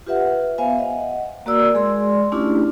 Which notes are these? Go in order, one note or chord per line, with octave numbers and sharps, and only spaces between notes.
F4 G4 B4 E5 F#5
B3 C5 E5 F5 G#5
D#5 F#5
A#3 F#4 A#4 D5 E6
G#3 G#4 D5 C6
A3 C#4 D4 E4 F4 G4